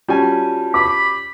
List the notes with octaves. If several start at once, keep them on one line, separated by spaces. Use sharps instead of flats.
G3 C#4 F4 F#4 G#5 A5
B5 D6